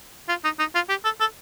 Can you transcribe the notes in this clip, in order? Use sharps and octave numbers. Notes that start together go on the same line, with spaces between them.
F4
D#4
D#4
F4
G4
A4
A4